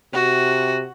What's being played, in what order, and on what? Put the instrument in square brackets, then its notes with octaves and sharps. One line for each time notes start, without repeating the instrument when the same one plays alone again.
[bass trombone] C3 [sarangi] F#4